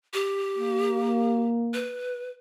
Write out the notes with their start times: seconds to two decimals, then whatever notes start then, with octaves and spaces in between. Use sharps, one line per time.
0.13 G4
0.57 A#3
1.74 B4